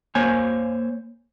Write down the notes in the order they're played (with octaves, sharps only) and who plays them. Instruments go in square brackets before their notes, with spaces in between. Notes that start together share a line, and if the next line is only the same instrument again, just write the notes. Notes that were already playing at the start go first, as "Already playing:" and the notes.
[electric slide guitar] A#3 C5 C#5 G#5